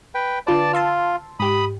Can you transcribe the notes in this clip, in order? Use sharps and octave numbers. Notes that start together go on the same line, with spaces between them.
B4 G5
D3 F4 B4 D5 A5
F4 A5 C6 E6
G#2 G4 B5 D#6